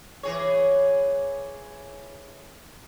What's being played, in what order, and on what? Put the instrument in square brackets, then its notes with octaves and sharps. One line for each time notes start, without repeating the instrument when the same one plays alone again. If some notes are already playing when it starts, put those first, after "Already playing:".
[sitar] E3 G#4 C#5